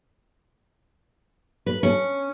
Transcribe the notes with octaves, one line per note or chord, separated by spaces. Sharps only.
B4
C#4